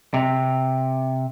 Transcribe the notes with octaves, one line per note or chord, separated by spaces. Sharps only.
C3